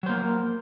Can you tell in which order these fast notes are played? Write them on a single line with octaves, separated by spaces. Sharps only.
F#3 C5 A#3